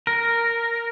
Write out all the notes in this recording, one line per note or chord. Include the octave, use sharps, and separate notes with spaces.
A#4